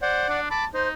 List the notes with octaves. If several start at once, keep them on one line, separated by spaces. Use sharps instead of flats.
C5 D5 F#5
D4
A5 B5 D6
D#4 C5